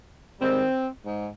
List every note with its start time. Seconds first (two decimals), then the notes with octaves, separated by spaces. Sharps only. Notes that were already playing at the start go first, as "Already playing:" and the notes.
0.41 G#2 D#3 G3 C4
1.05 G#2